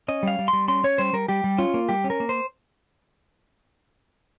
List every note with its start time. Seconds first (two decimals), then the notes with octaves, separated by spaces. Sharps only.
0.08 C#4 D#5
0.23 G3 F5
0.39 G3
0.48 C6
0.53 G3
0.68 C#4 C6
0.84 C#4 C#5
0.98 G3 C5
1.13 G3 A#4
1.28 G3 G4
1.44 G3
1.58 C#4 F4
1.74 A#3
1.89 G3 G4
2.04 C#4
2.10 A#4
2.20 A#3
2.29 C5